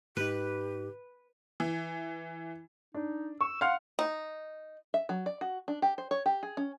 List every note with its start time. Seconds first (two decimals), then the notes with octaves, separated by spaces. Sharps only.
0.17 G#2 D#4 G4 B4
1.60 E3
2.94 D4 D#4
3.41 C#6 E6
3.61 F5 F#5 C6 F6
3.99 D#4
4.94 E5
5.09 F#3
5.26 D5
5.41 F#4
5.68 D4
5.82 G4
5.98 C5
6.11 C#5
6.26 G4
6.43 G#4
6.57 C#4